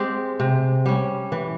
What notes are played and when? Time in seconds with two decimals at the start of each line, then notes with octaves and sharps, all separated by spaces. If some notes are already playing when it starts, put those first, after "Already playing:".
Already playing: G#3 C4 G4
0.40 C3
0.86 G3 C#4
1.32 E3